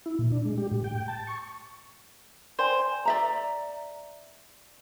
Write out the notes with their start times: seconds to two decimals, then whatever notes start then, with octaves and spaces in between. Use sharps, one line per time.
0.06 E4
0.19 A#2
0.32 D4
0.45 G#3
0.57 G4
0.71 A2
0.84 G5
1.08 A5
1.27 C#6
2.59 C5 D5 G5 G#5
3.05 D5 E5 A#5